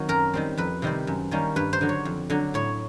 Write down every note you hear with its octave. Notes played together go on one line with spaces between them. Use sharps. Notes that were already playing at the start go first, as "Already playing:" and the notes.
Already playing: D#3 F#3 C4 F#4
F#2 A#4
D#3 G3 C4
F2 B4
C3 D#3 G3 C4
F#2
D#3 G3 A#3 C#4
G2 B4
C5
D3 F#3
C#5
F2
D3 F#3
A2 C#5